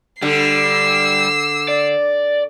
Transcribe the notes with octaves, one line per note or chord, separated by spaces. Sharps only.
D3 G3 E6 C7
D5